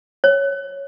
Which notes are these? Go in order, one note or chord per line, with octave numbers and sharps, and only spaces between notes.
C#5